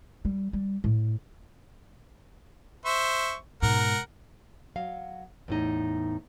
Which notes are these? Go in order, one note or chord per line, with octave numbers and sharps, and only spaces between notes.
G3
G3
A2
C5 E5 C#6
G#2 B2 A#4 F#5
F#3 F5
E2 A2 D#4